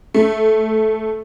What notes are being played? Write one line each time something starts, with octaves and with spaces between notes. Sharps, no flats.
A3